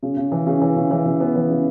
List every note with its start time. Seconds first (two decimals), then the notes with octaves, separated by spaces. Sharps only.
0.03 C#3
0.17 C#3
0.32 E3
0.47 C#3
0.61 E3
0.76 C#3
0.91 E3
1.05 C#3
1.20 B3
1.35 E3
1.49 C#3